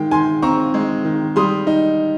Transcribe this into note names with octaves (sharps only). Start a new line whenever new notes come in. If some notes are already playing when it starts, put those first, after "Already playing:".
Already playing: D#3 G#3 G5
D#3 G#5 C6
C4 A#5 C#6
G#3
D#3
G3 C6 D#6
D#4